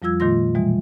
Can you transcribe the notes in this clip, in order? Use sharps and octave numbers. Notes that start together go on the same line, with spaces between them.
F2 F3 G3 F4 E6 G#6
A#2 D#3 A3 F4 C6 A#6
B2 E3 G3 G#3